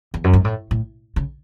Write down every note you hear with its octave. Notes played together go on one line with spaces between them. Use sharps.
E2
F#2
G#2
A2
A2
C#3